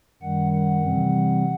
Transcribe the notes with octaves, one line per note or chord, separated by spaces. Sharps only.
F#2 D#3 G3 F#5
F#5
C3 E3 G3 C4